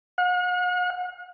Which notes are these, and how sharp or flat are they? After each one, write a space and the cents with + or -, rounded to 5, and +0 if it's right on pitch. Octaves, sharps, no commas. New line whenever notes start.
F#5 -45